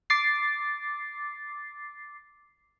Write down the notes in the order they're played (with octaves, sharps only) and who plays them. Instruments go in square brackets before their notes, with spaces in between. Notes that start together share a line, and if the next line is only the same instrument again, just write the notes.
[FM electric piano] D6 A6 C7